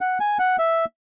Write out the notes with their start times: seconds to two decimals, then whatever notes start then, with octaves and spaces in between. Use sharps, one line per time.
0.01 F#5
0.20 G#5
0.39 F#5
0.59 E5